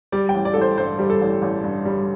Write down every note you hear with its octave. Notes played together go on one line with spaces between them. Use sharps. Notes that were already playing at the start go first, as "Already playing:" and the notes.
G3 D5
G5
A1
D5
A1 A4
C5
G2 C5
G3
A4
A1
A1
G2
G3